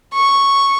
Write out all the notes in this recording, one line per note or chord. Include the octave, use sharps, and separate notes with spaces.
C#6